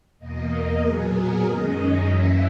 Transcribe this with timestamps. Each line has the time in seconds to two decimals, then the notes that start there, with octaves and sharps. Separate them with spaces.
0.19 E2 B2 A#3 D#5
0.50 A#4
0.82 A#2 F#3 B3 G#4
1.12 A#4
1.42 F#2 D#3 G#3 C#4 D#5
2.04 F#2 E3 A#3 C#4 E5